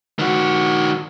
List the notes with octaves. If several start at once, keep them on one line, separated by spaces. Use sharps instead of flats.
D#3 F#4